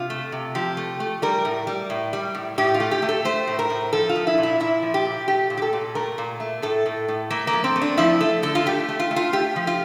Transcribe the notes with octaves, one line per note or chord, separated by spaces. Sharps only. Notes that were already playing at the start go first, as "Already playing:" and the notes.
Already playing: C3 F4
A3
C3
F3 G4
A3
A3
G3 A#4
A2
G3
A2
G3
A2
A2 G4
F4
A3
G4
A3
A4
A3 C5
A2
A#4
A2
F3 A4
F4
F3
E4
A#2
E4
A#2 E4
F3
G4
A#2
A3 G4
A#2
G4
A4
A#2
A3 A#4
A#2
A3
A2 A4
A2
A2
A3 A#3
A#3
F3
C4
A3
D4
F3 E4
A3 A4
D3 A4
F4
A3 G4
A3
F4
A3
F4
A3 G4
F3
F4